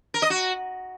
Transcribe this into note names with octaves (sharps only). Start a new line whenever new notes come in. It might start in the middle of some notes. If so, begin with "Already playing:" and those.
A#4
D#5
F#4